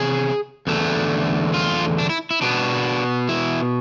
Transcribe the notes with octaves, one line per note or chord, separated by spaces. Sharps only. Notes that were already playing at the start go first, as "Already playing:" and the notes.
Already playing: C3 E3 B3 G#4
E2 D3 A3
F4
D4
E4
E4
B2 B3 D4
E4